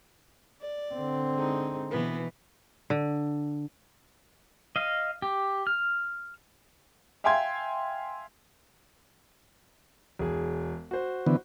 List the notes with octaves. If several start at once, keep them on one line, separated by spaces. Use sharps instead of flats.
D5
D3 C4
G#3 D#4
B2 E3 B3
D3
D#5 F5
G4
F6
E5 F5 G5 G#5 C6 G#6
E1 G#4
F#4 C5
D3 E3 B3